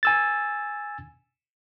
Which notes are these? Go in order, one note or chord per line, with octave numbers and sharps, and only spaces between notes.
G#5 E6 A6